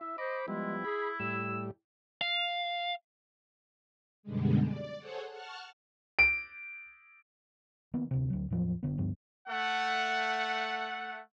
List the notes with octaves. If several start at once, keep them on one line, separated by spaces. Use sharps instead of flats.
E4 E5
C5 D#5 B5 D6
F3 G3 G#3 B3 E4
G#4 B5
A2 G3 E6
F5
F#2 B2 D3 G3 G#3
D5
G#4 A4 C5 C#5 F#5
F#5 A5 C#6 F6
D7
D#3 A#3 B3
D2 C3
D2 F#3
E2 A2 F3 F#3
F#1 D3 B3
D2 G2 F3 B3
A3 F#5